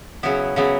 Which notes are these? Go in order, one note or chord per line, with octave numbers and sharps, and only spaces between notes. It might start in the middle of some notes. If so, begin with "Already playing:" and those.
C#3 F#3 B3 E4
C#3 F#3 B3 E4